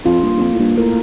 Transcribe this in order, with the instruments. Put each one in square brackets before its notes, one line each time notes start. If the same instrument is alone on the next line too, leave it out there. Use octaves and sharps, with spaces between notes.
[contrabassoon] F2 [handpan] F4
[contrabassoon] G2 [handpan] A#3
[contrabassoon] G2
[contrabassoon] F2 [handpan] F4
[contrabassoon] A2
[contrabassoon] G2 [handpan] A#3
[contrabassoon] A2 [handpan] A#4